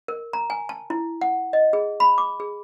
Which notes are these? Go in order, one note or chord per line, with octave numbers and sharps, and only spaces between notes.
A#4
A#5
G#5
A5
E4
F#5
D#5
G#4
B5
D6
G#4